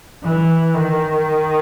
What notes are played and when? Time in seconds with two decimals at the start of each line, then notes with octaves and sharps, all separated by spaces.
0.24 E3
0.74 D#3